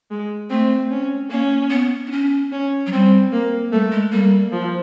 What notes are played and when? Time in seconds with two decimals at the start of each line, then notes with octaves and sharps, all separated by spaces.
0.11 G#3
0.50 A3 C4
0.91 C#4
1.30 A#3 C#4
1.70 B3
2.06 D4
2.11 C#4
2.52 C#4
2.86 F#3
2.92 G3 C4
3.32 A#3
3.72 G3 A3
3.92 G#3
4.12 G3 A#3
4.52 F3